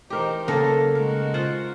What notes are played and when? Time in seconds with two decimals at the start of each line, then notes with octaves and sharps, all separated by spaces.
0.10 E3 D#4 G4 A#4 C5
0.48 C#3 F#3 A#3 A4
0.95 G#3 D#4 F#4 A#4
1.34 F4 C5 F#5